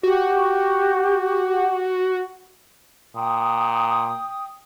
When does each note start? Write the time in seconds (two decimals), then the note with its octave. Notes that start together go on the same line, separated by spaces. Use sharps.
0.03 F#4 G4
3.15 A#2 G5 D#6